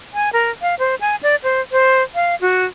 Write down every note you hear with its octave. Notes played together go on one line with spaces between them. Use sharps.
G#5
A#4
F5
C5
G#5
D5
C5
C5
F5
F#4